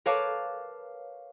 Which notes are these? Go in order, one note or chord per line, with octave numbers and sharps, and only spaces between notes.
A#4 B4 C#5 F5 A5 D6